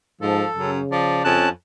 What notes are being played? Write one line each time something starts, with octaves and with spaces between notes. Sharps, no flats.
G#2 F3 A4
F#2 C#3
F3 D5
F2 C#4 A5 F#6